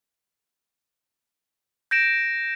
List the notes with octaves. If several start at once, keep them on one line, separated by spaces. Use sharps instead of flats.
G6 A#6 D7 E7